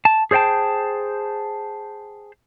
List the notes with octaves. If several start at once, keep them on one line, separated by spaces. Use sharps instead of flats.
A5
G#4 C5 D5 G5 A5